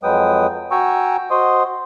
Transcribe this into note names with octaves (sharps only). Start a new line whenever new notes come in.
F2 F#3 G#3 B4 G5 D#6
F#4 G5 G#5 A#5 C#6 E6
F#4 C5 D#5 C6 D#6